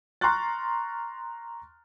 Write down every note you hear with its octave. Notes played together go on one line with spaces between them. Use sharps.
A#5 C6 C#6 F6 F#6 A6